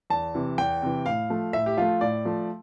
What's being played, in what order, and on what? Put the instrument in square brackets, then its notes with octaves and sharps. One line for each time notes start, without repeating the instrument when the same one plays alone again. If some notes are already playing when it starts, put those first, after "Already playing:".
[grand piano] E2 A5
C3 E3
E2 G5
C3 E3
A2 F5
F3 A3
A2 E5
G4
F3 A3 F4
A2 D5
F3 A3